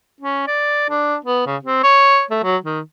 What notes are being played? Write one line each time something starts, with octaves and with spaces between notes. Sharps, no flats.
C#4
D5
D4
B3
C#3
C4
C#5
A3
F#3
D#3